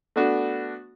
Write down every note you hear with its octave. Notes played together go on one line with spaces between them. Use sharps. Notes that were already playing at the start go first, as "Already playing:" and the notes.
A3 B3 D4 F#4